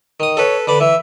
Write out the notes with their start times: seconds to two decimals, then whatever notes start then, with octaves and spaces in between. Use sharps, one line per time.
0.20 D#3 D#6
0.37 A4 B4 C#5
0.67 D3 B4 D5
0.81 E3 E5